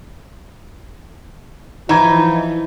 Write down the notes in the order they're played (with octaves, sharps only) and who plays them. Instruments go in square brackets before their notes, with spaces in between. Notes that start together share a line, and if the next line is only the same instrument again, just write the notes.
[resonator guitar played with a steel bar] E3 D#4 [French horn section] F3 E4 [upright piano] A#5 G#6